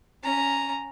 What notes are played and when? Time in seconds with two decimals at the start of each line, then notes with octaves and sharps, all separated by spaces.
0.23 C#4 A#5